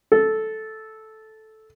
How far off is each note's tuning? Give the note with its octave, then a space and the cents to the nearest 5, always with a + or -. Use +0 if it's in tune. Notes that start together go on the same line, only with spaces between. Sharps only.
A4 -10